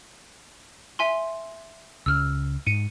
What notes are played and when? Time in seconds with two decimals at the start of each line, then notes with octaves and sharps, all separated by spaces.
0.99 E5 G#5 C6
2.06 C#2 C#3 E6 F6
2.67 G#2 C#7 D#7